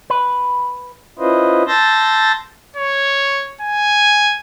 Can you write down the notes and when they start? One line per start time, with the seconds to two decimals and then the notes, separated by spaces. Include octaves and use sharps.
0.10 B4
1.19 C#4 E4 F4 B4 C5 D#5
1.68 A5 C6 E6 G6 A6 A#6
2.77 C#5
3.61 G#5